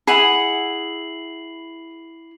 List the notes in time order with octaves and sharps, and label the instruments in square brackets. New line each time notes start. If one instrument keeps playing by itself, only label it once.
[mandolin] E4 F#5 D#6 [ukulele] G#4 [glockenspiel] C7 F#7